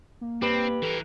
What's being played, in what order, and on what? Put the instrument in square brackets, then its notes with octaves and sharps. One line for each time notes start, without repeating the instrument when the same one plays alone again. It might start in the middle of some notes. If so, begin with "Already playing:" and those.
[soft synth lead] A#3
[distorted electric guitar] C4 [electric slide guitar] G4 B4
[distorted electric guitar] E3 A#4 [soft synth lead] A4